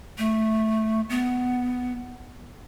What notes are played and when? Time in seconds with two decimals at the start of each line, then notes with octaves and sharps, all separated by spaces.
0.18 A3
1.10 B3